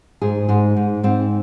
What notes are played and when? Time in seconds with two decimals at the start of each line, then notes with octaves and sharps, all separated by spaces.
0.21 G#2 G#4
0.48 G#2 G#4
0.76 G#2
1.03 G#2 C4